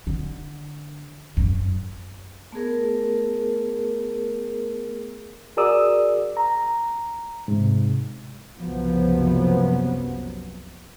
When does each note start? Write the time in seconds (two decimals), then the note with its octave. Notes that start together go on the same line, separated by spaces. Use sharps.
0.07 D3
1.37 F#2
2.52 A3 B3 G#4 A#4
5.57 F#4 G#4 A#4 D5 D#6 E6
6.37 A#5
7.48 G#2 C3
8.61 F#1 C2 C3 F3 F#3 B3